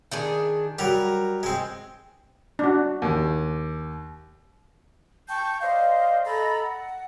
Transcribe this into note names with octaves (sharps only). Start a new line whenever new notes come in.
D#3 D4 G#4
F#3 G3 A#4
G#3 C4
D4 F#4
D#2
G5 A5 C#6 G6
C5 D5 D#5 F5
A4 D#5 A#5 B5
F#5